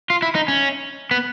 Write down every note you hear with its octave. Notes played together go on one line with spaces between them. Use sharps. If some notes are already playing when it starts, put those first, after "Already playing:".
F4
E4
D#4
C#4
B3